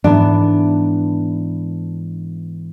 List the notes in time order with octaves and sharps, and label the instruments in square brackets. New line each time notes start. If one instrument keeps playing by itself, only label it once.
[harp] G#2 E3 B3 [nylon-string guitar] D4